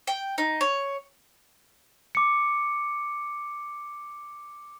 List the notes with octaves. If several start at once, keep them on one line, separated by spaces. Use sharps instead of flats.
G5
D#4
C#5
D6 C#7